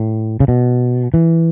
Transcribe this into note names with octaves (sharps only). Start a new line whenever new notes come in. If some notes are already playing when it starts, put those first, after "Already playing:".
Already playing: A2
C#3
B2
E3